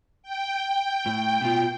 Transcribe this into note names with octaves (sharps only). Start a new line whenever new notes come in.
G5
G5
A2
B2 F4